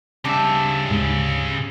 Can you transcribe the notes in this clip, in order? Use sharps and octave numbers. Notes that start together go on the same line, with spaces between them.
C#3 G3 C4 D4 E5
D2 G#2